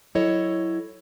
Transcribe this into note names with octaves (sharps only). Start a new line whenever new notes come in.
F#3 E4 A4 C#5 D#5